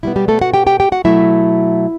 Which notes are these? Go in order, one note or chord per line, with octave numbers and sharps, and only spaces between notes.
B2 G3 B3 E4
G3 G4
A3 A4
F#4 F#5
G4 G5
G4 G5
G4 G5
F#4 F#5
B2 F#3 A3 E4 E5